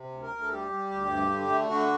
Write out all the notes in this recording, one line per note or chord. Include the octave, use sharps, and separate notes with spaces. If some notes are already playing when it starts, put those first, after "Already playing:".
Already playing: C3
D2
A#4
D2
A4
G3 G4
G3
D2
G2
D3
A3
D3 F#4